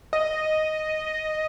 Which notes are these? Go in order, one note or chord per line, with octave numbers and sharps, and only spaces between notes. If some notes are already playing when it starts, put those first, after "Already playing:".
D#5